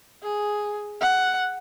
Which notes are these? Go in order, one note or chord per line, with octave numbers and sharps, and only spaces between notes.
G#4
F#5